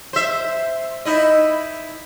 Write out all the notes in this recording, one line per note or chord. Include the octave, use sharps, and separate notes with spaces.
C5 E5
D#4 E4 D#5